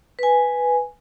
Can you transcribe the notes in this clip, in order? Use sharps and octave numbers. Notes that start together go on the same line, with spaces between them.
B4 G#5